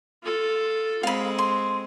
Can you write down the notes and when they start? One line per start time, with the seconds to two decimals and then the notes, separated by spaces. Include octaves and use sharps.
0.23 F4 A4
1.03 G#3 C4 F5 B5
1.39 C6